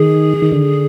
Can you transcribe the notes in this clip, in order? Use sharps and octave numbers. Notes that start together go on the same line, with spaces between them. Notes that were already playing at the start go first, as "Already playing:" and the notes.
Already playing: D#3 G#4
D#3
D3